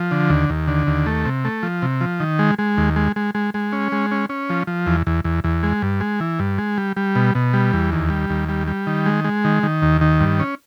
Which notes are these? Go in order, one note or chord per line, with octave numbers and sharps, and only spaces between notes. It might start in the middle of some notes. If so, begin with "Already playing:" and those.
Already playing: F3
D3
D#2
D#2
D3
D#2
A3
C3
A3
F3
C3
F3
D#3
G#3
G#3
D#2
G#3
G#3
G#3
G#3
C#4
G#3
C#4
C#4
F3
F3
E2
E2
E2
E2
G#3
G2
G#3
E3
G2
G#3
G3
G3
B2
B2
G3
E2
D#2
G3
D#2
G3
G3
D#3
G#3
G#3
D#3
D#3
D#2
D#3
G2
C#4